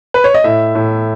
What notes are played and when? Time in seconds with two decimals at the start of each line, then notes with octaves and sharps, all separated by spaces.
0.14 B4
0.24 C#5
0.34 D#5
0.44 A2 E5
0.75 A2